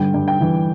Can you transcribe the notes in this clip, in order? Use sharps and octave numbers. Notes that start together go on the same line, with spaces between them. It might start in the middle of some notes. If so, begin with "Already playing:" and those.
Already playing: G2 D3 G5
G2
G5
E3